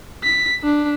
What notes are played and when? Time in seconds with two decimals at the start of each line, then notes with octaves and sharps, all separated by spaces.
0.24 B6
0.64 D4